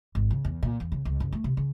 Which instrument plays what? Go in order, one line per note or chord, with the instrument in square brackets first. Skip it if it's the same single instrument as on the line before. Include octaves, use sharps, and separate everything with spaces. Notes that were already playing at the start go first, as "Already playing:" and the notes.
[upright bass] G#1
C#3
E2
A#2
E2
C#3
C#2
F#1
A3
C3
C#3